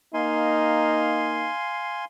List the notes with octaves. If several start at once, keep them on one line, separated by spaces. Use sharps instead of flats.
A#3 D#4 F5 G#5 C6